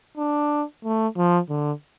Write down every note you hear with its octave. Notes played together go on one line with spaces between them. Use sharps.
D4
A3
F3
D3